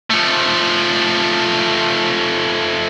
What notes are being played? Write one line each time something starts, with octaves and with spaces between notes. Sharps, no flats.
F3 A3